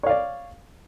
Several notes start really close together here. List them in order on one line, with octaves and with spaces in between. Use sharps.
C#5 F5 D5